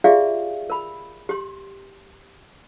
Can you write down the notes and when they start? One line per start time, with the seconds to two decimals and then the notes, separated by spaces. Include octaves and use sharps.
0.04 F4 G4 G#4 D5 E5 F5
0.70 A#4 B5
1.29 G4 C6